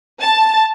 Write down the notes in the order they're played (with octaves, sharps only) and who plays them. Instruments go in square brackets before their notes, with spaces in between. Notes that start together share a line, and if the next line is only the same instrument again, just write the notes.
[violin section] A5